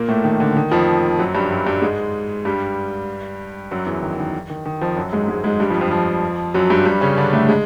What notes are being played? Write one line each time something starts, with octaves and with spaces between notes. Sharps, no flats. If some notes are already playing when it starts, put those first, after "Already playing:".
Already playing: A#2 A#3
A2 A3
D#3
D3
D#3
F2 F3
F#2 F#3
G2 G3
F#2 F#3
G2 G3
G#2 G#3
G2 G3
F#2 F#3
E2 E3
D#3
D#3
D#3
D#3
F2 F3
F#2 F#3
G#2 G#3
G#2 G#3
G#2 G#3
G2 G3
F2 F3
F2 F3
F2 F3
F#2 F#3
G2 G3
G2 G3
C#3 C#4
D3 D4
A2 A3
G#3